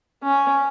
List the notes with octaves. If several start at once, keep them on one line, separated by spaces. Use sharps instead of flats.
C#4